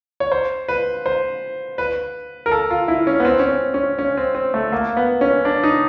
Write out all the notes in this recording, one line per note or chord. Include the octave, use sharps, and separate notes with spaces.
C#5
C5
B4
C5
B4
A#4
A4
F4
E4
C#4
B3
C4
C#4
C4
C#4
C#4
C4
C4
A3
A#3
B3
C#4
D4
D#4